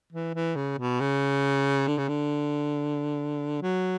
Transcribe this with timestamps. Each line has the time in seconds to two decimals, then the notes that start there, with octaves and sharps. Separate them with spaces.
0.13 E3
0.34 E3
0.56 C#3
0.78 B2
1.00 C#3
1.87 D3
1.98 C#3
2.08 D3
3.62 F#3